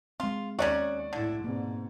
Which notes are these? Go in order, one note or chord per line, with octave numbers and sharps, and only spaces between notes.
G#3 C4 F4
D#2 C#4 D#4 F#4 D5
A2 D3 E4
G#2 B2 A#3 C4